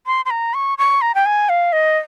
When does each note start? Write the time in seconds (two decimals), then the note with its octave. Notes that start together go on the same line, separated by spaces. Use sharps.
0.07 C6
0.25 C6
0.30 A#5
0.54 C#6
0.78 C#6
1.01 A#5
1.15 G5
1.26 G#5
1.49 F5
1.72 D#5